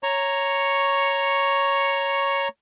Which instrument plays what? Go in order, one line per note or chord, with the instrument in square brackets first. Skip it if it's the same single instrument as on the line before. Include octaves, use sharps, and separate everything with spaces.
[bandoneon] C#5 A#5 C#6